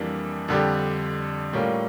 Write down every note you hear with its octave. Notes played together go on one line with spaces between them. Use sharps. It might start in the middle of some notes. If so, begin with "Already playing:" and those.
Already playing: F2 E3 G3 A#3 D4
F2 D3 G3 D4 G4
A2 G3 A#3 C#4 F4